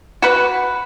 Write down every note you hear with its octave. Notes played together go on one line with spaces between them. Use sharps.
F#4 B4